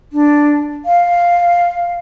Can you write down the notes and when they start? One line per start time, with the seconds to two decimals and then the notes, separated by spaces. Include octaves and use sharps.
0.12 D4
0.85 F5